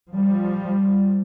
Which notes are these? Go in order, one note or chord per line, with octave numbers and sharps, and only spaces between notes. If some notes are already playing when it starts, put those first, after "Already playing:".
F3 G3